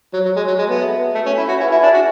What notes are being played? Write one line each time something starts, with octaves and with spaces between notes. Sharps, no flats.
F#3
F#3
G#3
F#3
G#3
B3 F#4 A4 E5 A5
A3
C#4
E4
F#4
E4 G#4 B4 E5 G#5
E4
D4
F#4